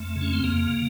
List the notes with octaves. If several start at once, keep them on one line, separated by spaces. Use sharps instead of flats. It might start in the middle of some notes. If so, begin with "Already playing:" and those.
Already playing: F2 A3
C#3
C#4
C4
F2 A#3